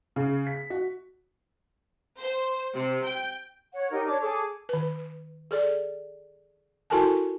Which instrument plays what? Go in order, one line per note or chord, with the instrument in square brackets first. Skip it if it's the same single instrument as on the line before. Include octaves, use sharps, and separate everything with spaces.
[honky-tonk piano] C#3
B6
F#4
[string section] C5
C3
G5
[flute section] C#5 F#5
D#4 G4 A#4 D#5
D4 C#5 D6
G#4 A4 D6
[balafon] D#3 B4
G#4 A4 D5
E4 F#4 A4 A#4 G#5 A5